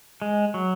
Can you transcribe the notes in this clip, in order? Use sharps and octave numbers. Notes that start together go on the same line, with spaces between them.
G#3
F#3